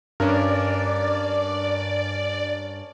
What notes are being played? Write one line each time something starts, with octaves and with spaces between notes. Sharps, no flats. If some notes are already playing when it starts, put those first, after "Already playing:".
G2 C#4 D4 A#4 D5